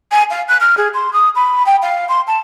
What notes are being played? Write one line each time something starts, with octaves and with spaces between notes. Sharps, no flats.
G#5
F5
F#6
F6
G#4
C6
D#6
B5
G5
F5
C6
A5